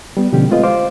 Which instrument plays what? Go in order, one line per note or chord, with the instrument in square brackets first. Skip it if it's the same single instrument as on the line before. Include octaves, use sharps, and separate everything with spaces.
[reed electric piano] G3 B3
B2 D3 F3 C#4 G4
G#3 A3 C4 F4 B4 D#5
C5 F5 D6